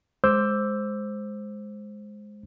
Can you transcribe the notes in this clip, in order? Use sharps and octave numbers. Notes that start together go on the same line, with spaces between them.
G#3 C5 D6 E6 G6